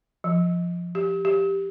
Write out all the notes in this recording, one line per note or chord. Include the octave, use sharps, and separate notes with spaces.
F3
G4
G4